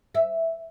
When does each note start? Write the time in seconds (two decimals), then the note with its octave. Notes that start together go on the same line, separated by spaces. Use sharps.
0.15 E5